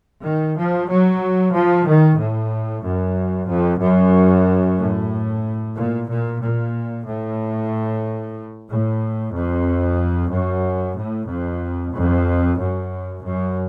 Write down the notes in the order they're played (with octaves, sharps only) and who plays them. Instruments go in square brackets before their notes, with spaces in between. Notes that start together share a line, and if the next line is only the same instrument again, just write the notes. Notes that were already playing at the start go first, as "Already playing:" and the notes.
[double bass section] D#3
F3
F#3
F3
D#3
A2
F#2
F2
F#2
A2
A#2
A#2
A#2
A2
A2
F2
F#2
A2
F2
F2
F#2
F#2